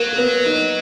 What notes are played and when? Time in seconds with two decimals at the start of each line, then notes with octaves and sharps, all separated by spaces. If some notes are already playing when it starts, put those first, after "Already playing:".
Already playing: F#3 A#3 A#4
0.12 A#4
0.17 B3 B4
0.45 D#4 D#5